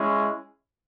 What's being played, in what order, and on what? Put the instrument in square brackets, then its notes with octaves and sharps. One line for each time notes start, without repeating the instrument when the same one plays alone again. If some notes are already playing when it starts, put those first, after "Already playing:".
Already playing: [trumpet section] G#3 C#4 E4